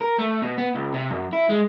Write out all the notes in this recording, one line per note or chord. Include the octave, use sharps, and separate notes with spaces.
A#4
A3
B2
B3
C#2
C3
F#2
E4
G#3